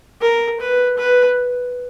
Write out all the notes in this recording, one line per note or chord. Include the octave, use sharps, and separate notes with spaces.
A#4
B4
B4